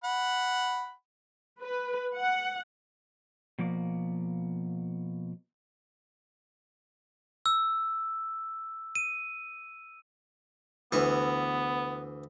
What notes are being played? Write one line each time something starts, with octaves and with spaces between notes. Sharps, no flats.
F#5 B5
B4
F#5
B2 F3 A#3 D5
E6
D#7
D2 E3 B3 C#6